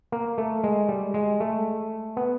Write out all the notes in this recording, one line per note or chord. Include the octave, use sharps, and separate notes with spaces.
A#3
A3
G#3
G3
G#3
A3
B3